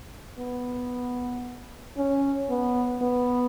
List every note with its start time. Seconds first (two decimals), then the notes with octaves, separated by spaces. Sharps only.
0.39 B3
1.97 C#4
2.50 B3
3.02 B3